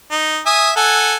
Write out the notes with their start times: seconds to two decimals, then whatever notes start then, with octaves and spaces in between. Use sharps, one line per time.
0.11 D#4
0.46 E5 G#5 D#6
0.76 A4 F#5 G#5